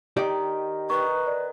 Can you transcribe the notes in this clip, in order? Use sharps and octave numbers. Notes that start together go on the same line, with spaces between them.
D#3 D#4 G4 D5
D#3 B4 C#6
D5